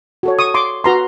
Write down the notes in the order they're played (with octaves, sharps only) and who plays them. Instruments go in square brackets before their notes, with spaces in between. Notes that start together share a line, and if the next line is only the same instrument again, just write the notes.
[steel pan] F#4 A4 C#5
C#6 D#6
C6 D6
F#4 B4 A#5 C6